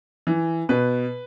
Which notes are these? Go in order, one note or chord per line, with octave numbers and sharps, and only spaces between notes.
E3
B2 B4